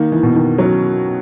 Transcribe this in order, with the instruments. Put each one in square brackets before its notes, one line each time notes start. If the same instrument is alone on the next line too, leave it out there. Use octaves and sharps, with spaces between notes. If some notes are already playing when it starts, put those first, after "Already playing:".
Already playing: [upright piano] D#3 [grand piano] A#3
[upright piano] E3
[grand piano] B2
[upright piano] D#3
[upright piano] F#3 [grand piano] C#4